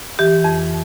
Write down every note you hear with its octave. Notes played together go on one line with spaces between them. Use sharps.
E3 G4
F2